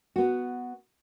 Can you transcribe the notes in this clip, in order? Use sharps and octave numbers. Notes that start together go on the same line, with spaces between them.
B3 F#4